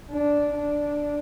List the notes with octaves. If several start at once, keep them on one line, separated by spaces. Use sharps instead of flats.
D4
D4